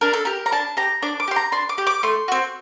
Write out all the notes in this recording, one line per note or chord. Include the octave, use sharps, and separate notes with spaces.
D4 A#4
A4
G4 A#4
A#5
D4 A5
G4 A#5
D4 D6
D6
G4 C6
A#5
D4 C6
D6
G4
D6
A3 C6
C4 F#4